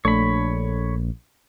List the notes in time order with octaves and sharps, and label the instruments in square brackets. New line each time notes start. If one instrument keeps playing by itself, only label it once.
[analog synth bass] A#1 [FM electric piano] A3 D4 A4 [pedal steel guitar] C#5 B5